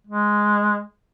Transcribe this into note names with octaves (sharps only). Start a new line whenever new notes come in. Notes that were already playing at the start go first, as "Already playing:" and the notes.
G#3